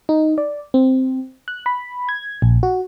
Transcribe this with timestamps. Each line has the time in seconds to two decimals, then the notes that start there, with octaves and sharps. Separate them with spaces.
0.09 D#4
0.38 D5
0.74 C4
1.48 F#6
1.66 B5
2.09 G#6
2.42 A#1
2.63 F#4